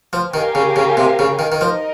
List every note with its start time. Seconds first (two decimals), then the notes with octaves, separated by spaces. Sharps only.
0.13 F3
0.34 D#3 G4 A#4 F5 G#5
0.55 C#3
0.76 C#3
0.97 C3
1.19 C#3
1.39 D#3
1.52 D#3
1.60 F3 D#4 A#4 D#5